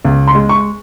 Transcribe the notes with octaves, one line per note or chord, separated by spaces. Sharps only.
C#2
C6
G#3
C#6